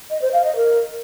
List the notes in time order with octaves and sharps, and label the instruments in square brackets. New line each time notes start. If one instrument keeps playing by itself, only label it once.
[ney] D#5
C5
F5
D#5
A#4